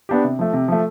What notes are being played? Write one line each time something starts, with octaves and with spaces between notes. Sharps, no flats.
B3 D4 G4
C3
F3 A3
C3
F3 A3